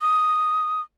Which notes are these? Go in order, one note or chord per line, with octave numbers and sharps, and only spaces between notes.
D#6